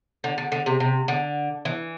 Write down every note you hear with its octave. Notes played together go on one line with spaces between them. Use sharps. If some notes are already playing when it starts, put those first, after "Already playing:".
D3
D3
D3
C3
C3
D3
E3